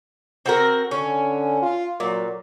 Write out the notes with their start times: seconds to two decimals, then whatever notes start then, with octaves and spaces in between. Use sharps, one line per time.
0.46 C4 F#4 A#4
0.91 D3 C#4
1.62 F4
2.00 A#2 F#3